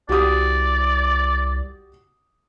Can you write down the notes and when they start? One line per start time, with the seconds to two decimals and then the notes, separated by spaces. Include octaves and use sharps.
0.09 C2 F#4 G4 D5 D#6